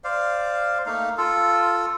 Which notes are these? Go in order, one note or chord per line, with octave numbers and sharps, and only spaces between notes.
C5 D5 F5
A3 A#3 D#4 F5
F4 A4